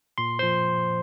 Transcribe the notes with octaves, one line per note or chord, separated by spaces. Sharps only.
A#2 C6
F3 C5 C6